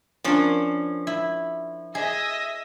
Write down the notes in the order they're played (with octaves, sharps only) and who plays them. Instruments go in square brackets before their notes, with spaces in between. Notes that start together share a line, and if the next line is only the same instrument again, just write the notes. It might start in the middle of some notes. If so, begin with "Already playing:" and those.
[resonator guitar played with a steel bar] F3 C#4 [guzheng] D4 A#4
[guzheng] E4
[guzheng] G#4 [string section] D#5 E5 B6